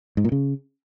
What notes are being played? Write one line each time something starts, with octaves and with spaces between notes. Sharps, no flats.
G#2
A#2
C#3